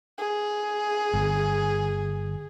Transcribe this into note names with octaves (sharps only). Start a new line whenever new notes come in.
G#4
G1